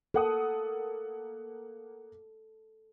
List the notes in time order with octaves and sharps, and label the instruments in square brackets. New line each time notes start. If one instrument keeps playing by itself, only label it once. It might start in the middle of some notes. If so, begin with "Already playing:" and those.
[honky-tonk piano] A#3 F#5 D#6 [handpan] A4